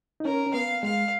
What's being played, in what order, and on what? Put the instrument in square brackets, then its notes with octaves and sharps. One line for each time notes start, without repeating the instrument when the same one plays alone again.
[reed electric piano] D#4
[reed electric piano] C#4 [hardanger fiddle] A#4
[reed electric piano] C#4
[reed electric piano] B3 [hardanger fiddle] F5
[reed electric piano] G#3 [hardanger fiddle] F5